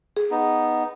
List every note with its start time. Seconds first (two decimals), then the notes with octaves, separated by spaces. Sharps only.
0.17 G#4
0.31 B3 D#4